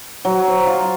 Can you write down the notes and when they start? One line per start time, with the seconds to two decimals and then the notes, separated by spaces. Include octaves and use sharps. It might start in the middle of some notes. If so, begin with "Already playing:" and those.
0.25 F#3
0.48 C5
0.67 F4